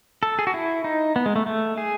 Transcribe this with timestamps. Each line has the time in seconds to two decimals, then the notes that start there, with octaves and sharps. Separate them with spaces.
0.23 A4
0.39 G#4
0.47 F#4
0.54 E4
0.84 D#4
1.16 B3
1.26 G#3
1.36 A3
1.47 A3
1.78 G#4